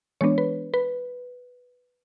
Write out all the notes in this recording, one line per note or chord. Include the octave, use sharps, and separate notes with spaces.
E3 G#3 B3 D4 C#5
B4
B4